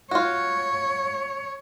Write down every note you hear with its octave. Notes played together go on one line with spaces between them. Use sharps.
F4 F#4 C#5